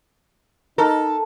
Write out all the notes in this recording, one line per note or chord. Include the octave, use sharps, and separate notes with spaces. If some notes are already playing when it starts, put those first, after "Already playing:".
D#4 A4 A#4